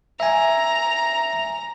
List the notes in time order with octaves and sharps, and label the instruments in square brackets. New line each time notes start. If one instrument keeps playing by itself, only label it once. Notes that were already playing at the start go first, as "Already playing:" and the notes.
[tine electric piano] E5 G#5 [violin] A#5